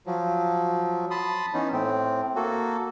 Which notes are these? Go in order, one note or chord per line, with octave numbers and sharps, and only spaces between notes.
F3 F#3
A5 B5 C6 D#6
E3 B3 C#4 D#4
A2 C4
A#3 F#4 A4